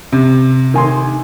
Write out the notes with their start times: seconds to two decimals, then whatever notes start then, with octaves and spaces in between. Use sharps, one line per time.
0.12 C3
0.74 D#3 G#5 C6